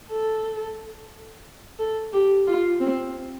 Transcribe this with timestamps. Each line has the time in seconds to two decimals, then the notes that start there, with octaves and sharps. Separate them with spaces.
0.10 A4
1.79 A4
2.13 G4
2.47 F4
2.81 C4